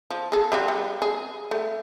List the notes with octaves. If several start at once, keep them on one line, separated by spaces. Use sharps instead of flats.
F3
G#4 A4
G3 F4 F#4
G3
G#4
A3